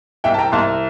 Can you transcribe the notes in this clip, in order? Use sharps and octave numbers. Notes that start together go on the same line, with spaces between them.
C2 E5 G5
A5
G5 A#5
C2 A5 C6